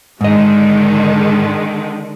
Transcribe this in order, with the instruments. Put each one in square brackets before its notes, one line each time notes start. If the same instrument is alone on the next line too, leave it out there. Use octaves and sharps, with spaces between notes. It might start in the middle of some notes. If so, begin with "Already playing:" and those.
[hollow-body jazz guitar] G#2 D#5 [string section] D3 D#3 G#3